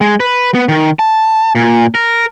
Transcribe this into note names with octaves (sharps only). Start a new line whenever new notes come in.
G#3
B4
B3
D#3
A5
A#2
A#4